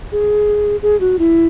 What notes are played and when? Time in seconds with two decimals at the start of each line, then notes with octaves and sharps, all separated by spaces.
0.12 G#4
0.82 G#4
1.00 F#4
1.19 E4